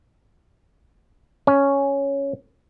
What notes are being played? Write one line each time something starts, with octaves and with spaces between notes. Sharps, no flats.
C#4